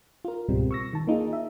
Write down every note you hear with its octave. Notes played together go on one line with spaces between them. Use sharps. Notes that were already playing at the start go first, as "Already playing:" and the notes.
F4 A#4
C#2 G#2 B2 G3 G#3 C4
C#6 E6 A#6
D#3 A5
A#3 D#4 F4 G#4
E5